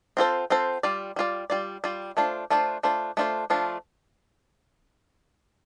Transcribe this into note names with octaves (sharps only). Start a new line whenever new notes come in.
C4 F4 A4 C5
C4 F4 A4 C5
G3 F4 D5
G3 F4 D5
G3 F4 D5
G3 F4 D5
A3 D4 F4 C5
A3 D4 F4 C5
A3 D4 F4 C5
A3 D4 F4 C5
F3 A3 D4 F4